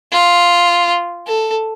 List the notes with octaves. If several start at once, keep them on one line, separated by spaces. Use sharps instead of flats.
F4
A4